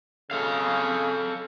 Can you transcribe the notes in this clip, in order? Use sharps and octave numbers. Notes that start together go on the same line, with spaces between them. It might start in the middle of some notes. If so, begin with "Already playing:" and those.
C#3 A4 F5